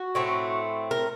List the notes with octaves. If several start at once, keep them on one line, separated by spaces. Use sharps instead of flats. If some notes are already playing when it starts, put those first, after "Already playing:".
Already playing: F#4
A2 A3 C4
A#4